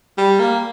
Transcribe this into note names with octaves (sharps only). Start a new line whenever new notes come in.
G3
A#3